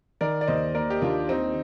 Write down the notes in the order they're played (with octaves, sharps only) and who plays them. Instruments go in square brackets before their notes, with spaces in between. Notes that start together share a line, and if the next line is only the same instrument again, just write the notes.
[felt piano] D#3 [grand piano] A#4 D5
[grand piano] D5
[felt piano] D#2 [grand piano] C5 D#5
[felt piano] A#3 [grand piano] A#4 D5
[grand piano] G4
[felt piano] D#2 [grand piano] D4 F4
[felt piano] D#3 [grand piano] C4 D#4